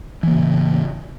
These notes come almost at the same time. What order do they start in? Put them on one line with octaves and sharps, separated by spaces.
E3 A#3 C#3 A2